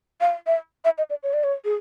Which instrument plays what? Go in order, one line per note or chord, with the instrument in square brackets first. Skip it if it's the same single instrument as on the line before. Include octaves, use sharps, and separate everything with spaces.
[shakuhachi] F5
E5
E5
D#5
D5
C#5
D5
C#5
G#4